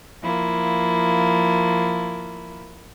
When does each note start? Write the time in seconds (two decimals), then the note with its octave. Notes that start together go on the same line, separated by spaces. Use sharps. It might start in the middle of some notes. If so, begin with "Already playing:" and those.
0.21 F3 A#3 E4